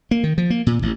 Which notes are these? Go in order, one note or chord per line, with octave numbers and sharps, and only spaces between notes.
A#3
D#3
F3
A#3
A#2
A1